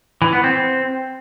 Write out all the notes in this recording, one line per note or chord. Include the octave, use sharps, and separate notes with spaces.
E3
B3
C4